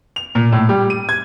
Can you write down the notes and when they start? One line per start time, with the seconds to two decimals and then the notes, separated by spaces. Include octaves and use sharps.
0.16 F7
0.35 A#2
0.52 A2
0.69 G3
0.90 D#7
1.09 G#6